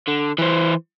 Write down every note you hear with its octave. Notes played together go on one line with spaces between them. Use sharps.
D3
E3 C5